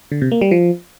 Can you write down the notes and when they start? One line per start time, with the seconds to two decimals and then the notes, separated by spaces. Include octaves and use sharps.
0.12 D3
0.22 C3
0.31 A#3
0.41 G3
0.51 F3